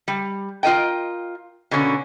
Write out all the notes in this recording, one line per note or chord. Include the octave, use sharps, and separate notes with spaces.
G3
F4 A#4 D#5 G5
B2 D3 A#3 C#4